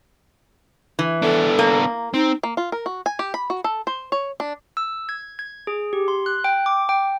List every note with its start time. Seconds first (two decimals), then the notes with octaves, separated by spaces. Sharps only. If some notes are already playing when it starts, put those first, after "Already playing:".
0.99 E3
1.22 B3 D4 A4
1.59 A#3
2.14 C4 D#4
2.43 A#3
2.57 F4
2.72 A#4
2.86 F#4
3.06 G#5
3.19 G4
3.34 B5
3.50 F#4
3.64 A4
3.87 C5
4.12 C#5
4.40 D4
4.77 E6
5.09 G#6
5.39 G#6
5.67 G#4
5.93 G4
6.08 C6
6.26 F#6
6.44 G5
6.66 D6
6.89 G5